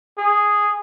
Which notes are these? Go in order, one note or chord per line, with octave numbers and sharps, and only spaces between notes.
G#4